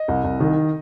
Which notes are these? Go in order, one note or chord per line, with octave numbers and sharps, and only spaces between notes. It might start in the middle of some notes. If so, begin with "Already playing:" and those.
Already playing: D#5
C2
C2
D#3